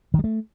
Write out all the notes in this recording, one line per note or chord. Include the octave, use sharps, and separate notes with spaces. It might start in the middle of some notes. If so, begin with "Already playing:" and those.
D#3
G3
A3